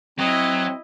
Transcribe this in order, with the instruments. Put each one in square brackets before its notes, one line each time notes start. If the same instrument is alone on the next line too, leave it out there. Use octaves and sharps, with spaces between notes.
[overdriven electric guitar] F#3 [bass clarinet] C4 [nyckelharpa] E4 D#5